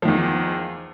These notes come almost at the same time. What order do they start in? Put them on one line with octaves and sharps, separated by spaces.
F3 D#3 E2